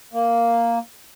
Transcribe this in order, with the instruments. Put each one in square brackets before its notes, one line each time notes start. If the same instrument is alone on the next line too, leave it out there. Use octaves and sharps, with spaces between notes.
[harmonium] A#3